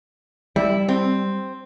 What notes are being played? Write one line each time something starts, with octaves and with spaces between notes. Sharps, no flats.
G3 E4
C4